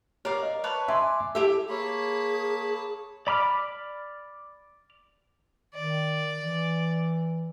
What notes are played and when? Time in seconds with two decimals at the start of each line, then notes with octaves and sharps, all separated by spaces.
0.25 A#4 C#5 D5 F5
0.43 D#5
0.64 B4 C#5 A5
0.88 D5 E5 G#5 C6
1.35 E4 G4 A4 E5
1.69 A#3 G#4 C#5 A5 B5
3.27 D5 B5 D6 F6
5.75 D#3 D5
6.37 E3